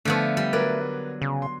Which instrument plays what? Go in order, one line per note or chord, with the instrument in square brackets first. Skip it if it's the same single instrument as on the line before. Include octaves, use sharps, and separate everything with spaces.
[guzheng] D3 F3 B3 [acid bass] A3
[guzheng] G3
[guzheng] F#3 D5 [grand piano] A#4 B4
[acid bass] C#3
[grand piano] C6